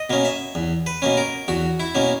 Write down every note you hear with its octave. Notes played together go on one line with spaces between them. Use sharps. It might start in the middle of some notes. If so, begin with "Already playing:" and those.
Already playing: D#5
B2 A#3 C#4
E5
E2
B4
B2 A#3 C#4
A#4
E2 F#4
E4
B2 A#3 C#4